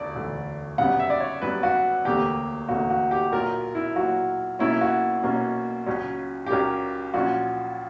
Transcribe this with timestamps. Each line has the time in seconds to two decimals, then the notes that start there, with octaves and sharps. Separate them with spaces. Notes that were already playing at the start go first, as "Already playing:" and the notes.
Already playing: E1 D2 D3 D5
0.15 E1 D2 D3
0.78 F#1 F#2 C#3 G3 B3 F#5
0.99 E5
1.10 D5
1.20 C#5
1.42 F#1 F#2 C#3 G3 B3 B4
1.63 F#4
2.05 E1 D2 D3 A#3 G4
2.68 E1 D2 D3 A#3 F#4
2.90 F#4
3.11 G4
3.32 B1 A#2 F#3 A#4
3.75 E4
3.96 B1 A#2 F#3 F#4
4.59 B1 B2 A#3 C#4 E4
4.81 F#4
5.23 B1 B2 A#3 C#4
5.86 C#2 C#3 F#3 C#4
6.46 G4
6.50 C#2 C#3 F#3 C#4 A#4
7.14 A#1 A#2 F#3 C#4 F#4